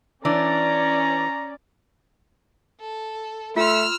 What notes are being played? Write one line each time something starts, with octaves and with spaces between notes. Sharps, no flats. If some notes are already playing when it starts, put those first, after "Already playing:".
E3 C#4 D4 D5 A#5
A4
A3 F4 C6 E6 F6